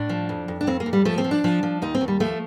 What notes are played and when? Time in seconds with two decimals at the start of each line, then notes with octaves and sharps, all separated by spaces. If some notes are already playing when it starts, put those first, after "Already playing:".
Already playing: A2 D4
0.09 F3
0.29 F2
0.48 F2
0.61 D4
0.67 F2 C4
0.80 A#3
0.86 F2
0.93 G3
1.05 F3 A3
1.18 C4
1.24 F3
1.31 D4
1.44 F3
1.63 F3
1.82 D#2 D#4
1.95 C4
2.01 D#2
2.08 G3
2.20 F3 A3